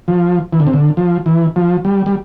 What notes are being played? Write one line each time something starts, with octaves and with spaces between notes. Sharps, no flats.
F3
E3
D3
C3
D3
F3
E3
F3
G3
G3